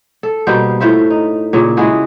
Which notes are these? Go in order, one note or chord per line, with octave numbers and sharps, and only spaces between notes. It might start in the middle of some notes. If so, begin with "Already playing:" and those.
A4
B2 G3 A#3 C5
A2 F4 C5 E5
D#4
A#2 C#3
G#3 E4 F#4 G#4